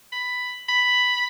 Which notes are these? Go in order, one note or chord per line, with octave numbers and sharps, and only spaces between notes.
B5
B5